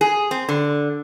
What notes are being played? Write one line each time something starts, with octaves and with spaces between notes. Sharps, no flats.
G#4
C4
D3